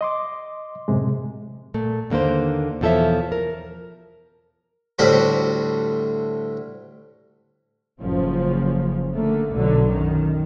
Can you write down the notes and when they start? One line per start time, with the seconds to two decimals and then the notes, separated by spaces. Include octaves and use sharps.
0.01 D#5 C6 D6
0.88 F#2 A2 C3 G#3
1.74 A#2 A3
2.10 D#2 D3 A#3 B4 C5
2.81 E2 B2 F3 A4 C#5 E5
3.32 A#4
4.99 D2 A2 G3 F#4 C5 B5
8.01 F#1 A2 C#3 F3
9.13 D3 A3 A#3
9.52 B1 B2 D3 F#3
9.89 F#2 D#3